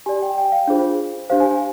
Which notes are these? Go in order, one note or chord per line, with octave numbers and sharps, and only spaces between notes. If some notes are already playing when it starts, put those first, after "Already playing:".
G4 D5 G#5
G5
G5
F5
D4 F4 G#4 C5
D4 G4 C5 F5
G#5
G#5